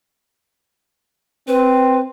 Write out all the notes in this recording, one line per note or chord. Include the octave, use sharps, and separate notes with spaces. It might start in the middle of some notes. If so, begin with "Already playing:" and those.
C4 B4